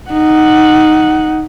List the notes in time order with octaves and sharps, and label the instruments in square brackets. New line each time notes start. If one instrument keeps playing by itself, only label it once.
[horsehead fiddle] D#4 F#5